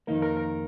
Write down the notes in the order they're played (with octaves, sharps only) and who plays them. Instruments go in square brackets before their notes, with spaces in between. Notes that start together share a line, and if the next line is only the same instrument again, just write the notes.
[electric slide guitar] F2 D#3 A#3 D#4 [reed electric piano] A#4
[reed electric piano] A#4
A#4